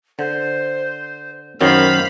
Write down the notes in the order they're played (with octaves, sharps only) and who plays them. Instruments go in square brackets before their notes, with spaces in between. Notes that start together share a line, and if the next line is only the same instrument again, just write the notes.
[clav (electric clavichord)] D3 [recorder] C5
[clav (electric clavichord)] F#2 D#3 F#3 [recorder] C5 [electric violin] F5 B5